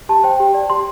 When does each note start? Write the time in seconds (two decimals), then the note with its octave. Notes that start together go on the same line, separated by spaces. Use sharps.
0.09 G4 A5
0.24 C5 G5
0.40 G4
0.54 D5
0.70 G4 C6